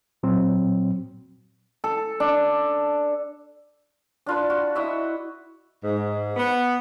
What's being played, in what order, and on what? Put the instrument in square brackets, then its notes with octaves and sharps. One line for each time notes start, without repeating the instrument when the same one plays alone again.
[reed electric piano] A#2 F#3 C4
[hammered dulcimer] A4
D4
[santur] D4 F4 B4
F#4
E4 F#4 D#5 E5
[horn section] G#2
B3